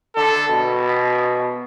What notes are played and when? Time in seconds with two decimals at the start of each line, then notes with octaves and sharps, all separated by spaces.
0.16 D3 A4
0.49 B2